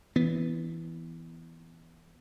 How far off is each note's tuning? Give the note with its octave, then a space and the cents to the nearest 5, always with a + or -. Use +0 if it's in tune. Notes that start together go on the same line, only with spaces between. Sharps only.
E3 +0 B3 +0